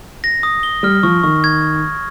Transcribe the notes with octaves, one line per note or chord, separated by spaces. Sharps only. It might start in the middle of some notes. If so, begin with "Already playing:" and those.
A#6
D#6
G7
G3 F6
F3 C#6
D#3 C#6
G#6